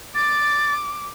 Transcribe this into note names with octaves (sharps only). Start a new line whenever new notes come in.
D6 A6